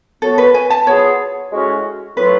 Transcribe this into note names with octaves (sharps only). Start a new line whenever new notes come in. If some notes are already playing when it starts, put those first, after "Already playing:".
F#3 B3 F#4 A4
B4
G#5
A5
F#3 B3 F4 G#4 C#5
A2 G#3 C#4 F#4
A2 F#3 A3 F4 B4